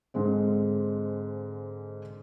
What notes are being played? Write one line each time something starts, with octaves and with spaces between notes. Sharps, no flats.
G#2 D3 G#3 C4